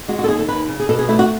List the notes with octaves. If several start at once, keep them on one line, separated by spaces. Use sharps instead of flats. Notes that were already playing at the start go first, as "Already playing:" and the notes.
G#3 F#4
F#4
A4
D#2 G#4
A4
D#2 B4
C#3
G#4
B2 A4
G#4
A3 E4
F#4